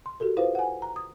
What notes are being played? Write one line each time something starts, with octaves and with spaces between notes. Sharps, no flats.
C6
F#4 G4 A4 A#4
E4 F4 B4 C5 F5
F#5 G#5
A#5
D#6